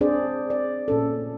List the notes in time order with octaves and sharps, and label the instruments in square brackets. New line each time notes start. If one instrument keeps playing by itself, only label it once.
[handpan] C4 D4 G#4 C5 D5
D5
A#2 C#4 A4